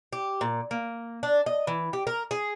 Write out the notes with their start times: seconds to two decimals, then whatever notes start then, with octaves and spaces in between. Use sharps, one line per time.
0.13 G4
0.41 A#2
0.71 A#3
1.23 D4
1.46 D#5
1.67 E3
1.93 G4
2.07 A#4
2.31 G#4